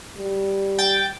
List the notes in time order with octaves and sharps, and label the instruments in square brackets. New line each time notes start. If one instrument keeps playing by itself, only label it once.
[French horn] G3
[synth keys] G5 A6